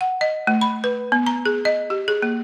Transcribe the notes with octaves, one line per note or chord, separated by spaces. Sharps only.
F#5
D#5
A3
B5
B4
B3
A#5
G#4
D#5
G4
G#4
A#3